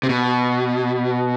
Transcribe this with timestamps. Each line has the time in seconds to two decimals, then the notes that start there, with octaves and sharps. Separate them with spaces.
0.03 C3
0.09 B2